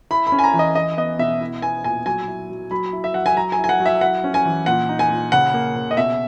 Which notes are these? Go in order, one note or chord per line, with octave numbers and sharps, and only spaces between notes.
E4 B5
B5
C#4
G#5
A#5
E3
D#5
E4 D#5
B3 D#5
B2 E5
E4
B3 G#5
A#2 G#5
F#3 G#5
E4
F#3
F#3 B5
E4
E5
F#3 F#5
G#5
F#3 A#5
G#5
E4
G#5
F#5
F#3
E5
E4 F#5
C#4
G#5
E3
A#2 F#5
D#4
G#5
A#2
C#3 F#5
A#3
C#3
D#5
B2 E5